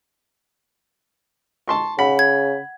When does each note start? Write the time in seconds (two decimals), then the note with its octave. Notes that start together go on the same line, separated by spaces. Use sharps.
1.68 A5 C6 C#6
1.99 C#3 F#5 B5
2.19 G#6